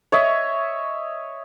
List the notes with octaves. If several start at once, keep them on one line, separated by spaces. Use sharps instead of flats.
C#5 D#5 E5